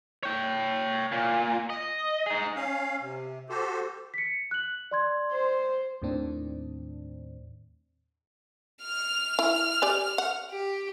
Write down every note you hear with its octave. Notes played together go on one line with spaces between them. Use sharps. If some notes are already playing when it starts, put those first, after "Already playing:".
C#5 G5
A#2
D#5
D#4 G#4
C#4 F5
C3
F#4 G4 A4 C5
B6 C#7
F#6 F#7
D5 C6 G#6
C5
D#2 A2 D#3 C4 D4
F6 F7
E4
G4 D5 G#5
F#5
G4